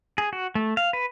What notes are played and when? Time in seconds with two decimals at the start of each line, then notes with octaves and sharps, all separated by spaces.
0.18 G#4
0.33 F#4
0.55 A3
0.77 F5
0.93 B4